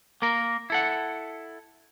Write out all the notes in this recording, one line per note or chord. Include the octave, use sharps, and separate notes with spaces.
A#3 A#4
E4 A4 F#5